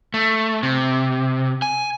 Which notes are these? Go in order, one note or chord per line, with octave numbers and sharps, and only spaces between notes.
A3
C3
G#5